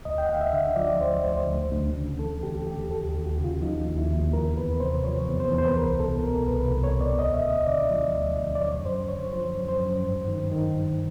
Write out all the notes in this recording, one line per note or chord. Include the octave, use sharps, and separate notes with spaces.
D2 D#5
G5
F#5
D2 F5
E5
D3
F3 D5
D2 C5
D2 C5
D2
D2
C#3
E3 A4
D2 G4
D2 G4
D#2 A4
G4
D#2
F#4
C#3
F4
F3 D#4
D#2
E4
D#2
E2 A#4
E2 B4
C3 C5
F3 C#5
E2
C5
E2
C5
B4
C2 A#4
B2 A4
B2 A#4
C2 B4
C2
C#5
B2
D5
D2 D#5
E5
D2 D#5
D3 D5
F3
D2
D2
D5
F#2 C#5
F#2 C5
D3 C#5
F3 C5
F#2
C5
F#2
G2
D#3
D#3
G2